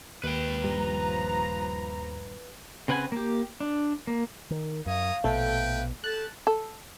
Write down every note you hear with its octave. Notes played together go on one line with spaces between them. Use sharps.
D#2 B4 G5
D#1 G2 F3 G3 A#5
C#3 C4 B4 F#5 G#5
A#3 G4
D4
A#3
D#3
F#2 C#5 F5 A#5 D#6
A#1 B2 A3 A4 B4 G5
G4 A4 A5 F#6
A4